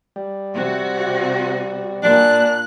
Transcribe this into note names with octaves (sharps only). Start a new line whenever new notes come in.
G3
C3 F#4
A#2 D4 F#6